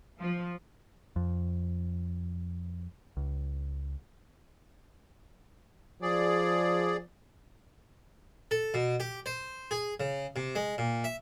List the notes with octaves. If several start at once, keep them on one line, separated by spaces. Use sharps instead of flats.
F3
F2
C#2
F3 G#4 D5
A4
B2
G4
C5
G#4
C#3
C3
G#3
A#2
E5